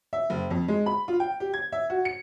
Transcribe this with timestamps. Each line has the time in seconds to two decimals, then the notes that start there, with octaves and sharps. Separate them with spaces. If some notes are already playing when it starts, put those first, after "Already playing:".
0.13 E5
0.30 F#1
0.50 F2
0.68 G#3
0.86 B5
1.08 F4
1.20 G5
1.40 G4
1.54 G#6
1.72 E5
1.90 F#4
2.05 C#7